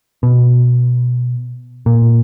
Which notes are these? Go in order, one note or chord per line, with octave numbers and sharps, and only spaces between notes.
B2
A#2